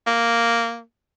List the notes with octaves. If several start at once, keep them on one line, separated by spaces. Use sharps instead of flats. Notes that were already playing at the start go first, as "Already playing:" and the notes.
A#3